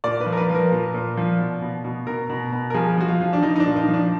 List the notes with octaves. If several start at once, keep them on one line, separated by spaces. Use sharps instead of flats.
A#2 D5
B4
F3
A#4
B4
F3
A#4
A#2
A#2
F3
B2
B2
B2
B2 A#4
B2
B2
A#4
F3 G#4
F3 F#4
F4
F3
D4
F3 D#4
D#4
D4
A#2
D#4
F3
D4